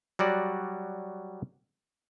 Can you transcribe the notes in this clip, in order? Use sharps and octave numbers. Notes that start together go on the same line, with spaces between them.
F#3 G3 F#4 D5